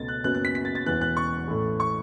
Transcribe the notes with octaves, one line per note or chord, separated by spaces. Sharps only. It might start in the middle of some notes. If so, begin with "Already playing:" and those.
Already playing: C#2 B2 A3 A6
F#6
F#1 F#2 F#3 B3 F#6
F#6
B6
B6
A6
A6
E1 E2 E3 F#6
F#6
C#6
A1 A2 A3
C#6